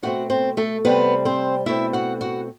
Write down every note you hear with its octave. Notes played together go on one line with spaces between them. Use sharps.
B2 A3 C4 F#4 F#5
C4 C5
A3 A4
C3 G3 B3 C4 B4
C4 C5
B2 A3 C4 E4 E5
F#4 F#5
F#4 F#5